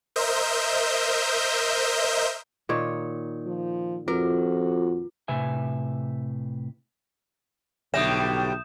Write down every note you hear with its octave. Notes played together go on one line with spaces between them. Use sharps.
A#4 C5 D#5 E5 G6
A#2 D#3 C#5
F3
F2 F4 F#4 A#4
A2 C3 B4 E5 G#5
B1 A2 D3 G3 E5 D#6 G6 E7